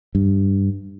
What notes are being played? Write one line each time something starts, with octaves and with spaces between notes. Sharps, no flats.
G2